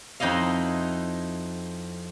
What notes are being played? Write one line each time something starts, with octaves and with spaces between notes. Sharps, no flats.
F2 D#4 E4 D#5 F5